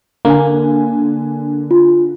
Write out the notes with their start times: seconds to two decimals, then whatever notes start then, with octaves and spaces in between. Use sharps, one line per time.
0.25 D3 A#3 G#5
1.71 F4